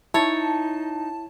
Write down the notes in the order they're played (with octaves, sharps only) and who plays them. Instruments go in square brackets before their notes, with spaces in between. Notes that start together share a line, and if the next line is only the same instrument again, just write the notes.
[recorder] D#4 [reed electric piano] E4 A6 [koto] C#5 [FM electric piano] A5